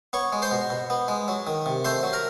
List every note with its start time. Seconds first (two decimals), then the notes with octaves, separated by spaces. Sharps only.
0.13 B3 C#5 C#6
0.32 G#3
0.42 C5 C6
0.52 B2
0.70 B2
0.90 B3
1.08 G#3
1.28 F#3
1.47 D#3
1.66 C3
1.84 A3 C5 C6
2.03 F#3
2.13 A#4 A#5